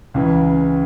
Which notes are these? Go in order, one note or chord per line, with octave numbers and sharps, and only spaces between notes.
C#2 C#3 E3